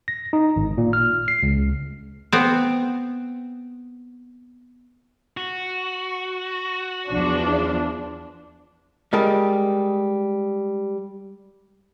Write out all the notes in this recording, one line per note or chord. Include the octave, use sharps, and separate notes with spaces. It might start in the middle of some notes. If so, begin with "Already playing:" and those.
A#6
D#4
G#1
A#2
F6
C7
C#2
B3 C4
F#4
E2 F3 D4
G3 G#3 A#4 A5